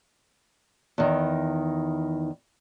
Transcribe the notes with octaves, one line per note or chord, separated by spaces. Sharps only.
E2 D#3